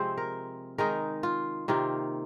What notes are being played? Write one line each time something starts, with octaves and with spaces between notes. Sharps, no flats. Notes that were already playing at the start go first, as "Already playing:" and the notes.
Already playing: C3 F3 G#3 C4 C5
A#4
D#3 G#3 D#4 A#4
F4
C3 D#3 A#3 F4